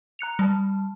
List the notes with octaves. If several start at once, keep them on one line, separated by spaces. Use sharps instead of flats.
A#5 F#6 C#7 F7
G3 A5